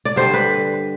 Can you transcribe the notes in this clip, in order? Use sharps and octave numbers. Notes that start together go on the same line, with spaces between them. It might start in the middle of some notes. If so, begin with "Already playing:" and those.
D5
G2 D3 G3 C5
B4